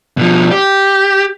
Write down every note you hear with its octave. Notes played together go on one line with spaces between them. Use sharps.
B2 F3
G4